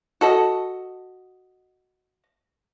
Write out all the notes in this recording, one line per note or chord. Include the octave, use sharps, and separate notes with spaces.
F#4 A4 D#5